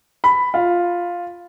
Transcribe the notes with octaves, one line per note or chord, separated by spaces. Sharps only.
B5
F4